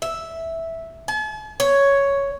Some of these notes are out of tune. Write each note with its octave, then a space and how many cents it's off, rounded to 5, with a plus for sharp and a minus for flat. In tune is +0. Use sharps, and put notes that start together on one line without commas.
E5 -5
A5 -45
C#5 +5